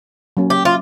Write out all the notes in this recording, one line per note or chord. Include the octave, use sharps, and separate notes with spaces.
F#3 A#3 C#4
G4
F4